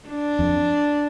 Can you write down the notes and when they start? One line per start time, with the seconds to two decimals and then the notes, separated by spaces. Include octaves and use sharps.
0.08 D4
0.39 F2